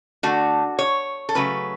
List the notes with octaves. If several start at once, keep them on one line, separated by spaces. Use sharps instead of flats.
D3 A3 F#4
C#5
A4
C#3 F#3 A3 B4